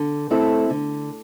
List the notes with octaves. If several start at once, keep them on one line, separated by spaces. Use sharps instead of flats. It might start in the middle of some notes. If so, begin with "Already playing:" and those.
Already playing: D3
A3 C4 E4 A4
D3